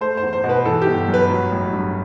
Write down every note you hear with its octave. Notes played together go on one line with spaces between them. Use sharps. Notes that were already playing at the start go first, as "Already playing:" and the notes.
A3 C5
E2 C5
C5
B2
B4
E3 A4
G4
G1
F#2
B4
F#3
A1
G2